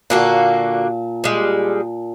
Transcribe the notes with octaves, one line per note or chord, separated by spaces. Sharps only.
A#2 D3 A#3 F#4 A5
G3 G#3